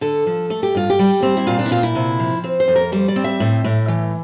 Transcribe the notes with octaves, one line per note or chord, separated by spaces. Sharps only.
D3 A4
F3
A3 A4
G4
G2 F4
G4
G3
C4
E4
A#2 F4
D4
E4
A#2 F4
E4
C3
F3
C4 C5
C5
F2
A#4
G3 C5
D5
C4
E5
A2
A2
E3